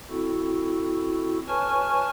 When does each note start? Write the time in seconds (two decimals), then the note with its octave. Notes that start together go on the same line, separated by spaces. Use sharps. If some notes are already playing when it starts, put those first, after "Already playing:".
0.10 C4 E4 F#4 A4
1.48 B4 C#5 G#5 A5 C#6 F6